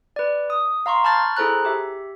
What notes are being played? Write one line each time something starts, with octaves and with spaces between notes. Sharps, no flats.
B4 D5
D#6
F5 A#5 C6 C#6
A5 B5 C#6 F6 G6 A6
E4 G#4 A4 C5 A#5 F#6
G4 E5